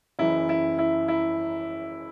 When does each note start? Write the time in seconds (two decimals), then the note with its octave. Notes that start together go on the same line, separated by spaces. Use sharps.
0.19 F#1 F#2 E3 E4
0.49 E4
0.79 E4
1.08 E4